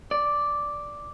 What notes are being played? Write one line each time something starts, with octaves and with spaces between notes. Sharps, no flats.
D5